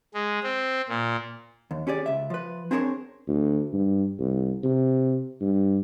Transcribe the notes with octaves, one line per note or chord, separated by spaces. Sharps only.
G#3
C4
A#2
D#2
C#4 G4 G#4 D5
C#2 E5
F3 B4
C4 D4 G#4 A#4 C5 C#5
D2
G2
C2
C3
G2